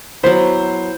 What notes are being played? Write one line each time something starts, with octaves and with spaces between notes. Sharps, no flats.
F#3 B3 E4 C5